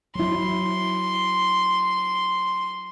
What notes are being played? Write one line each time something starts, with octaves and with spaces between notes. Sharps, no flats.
F#3 E4 C6